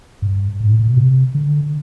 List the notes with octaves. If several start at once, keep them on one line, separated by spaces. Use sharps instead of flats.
G2
G#2
A2
A#2
B2
C3
D3